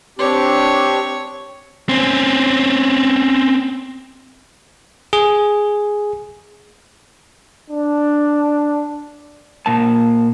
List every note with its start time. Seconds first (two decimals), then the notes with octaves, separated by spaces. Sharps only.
0.19 C4 D4 G4 C#5
1.89 C4 C#4
5.13 G#4
7.71 D4
9.66 A#2 A#3 A5